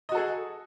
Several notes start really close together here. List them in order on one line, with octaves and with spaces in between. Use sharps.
D#5 F#4 A4 G#4